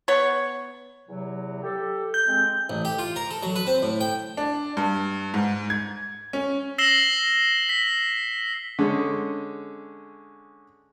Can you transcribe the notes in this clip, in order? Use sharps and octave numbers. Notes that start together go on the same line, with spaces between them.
B3 C#5
E2 C3 F#3
G4 A4
G6
G#3 C4
A1
G4
F4
A#4
A4
F#3
B4
C4
A2
G5
D4
G2
G#2
G#6
C#4
E6 A#6 C7 E7 F#7 G7
B6
D3 G#3 C#4